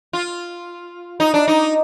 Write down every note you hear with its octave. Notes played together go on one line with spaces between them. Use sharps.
F4
D#4
D4
D#4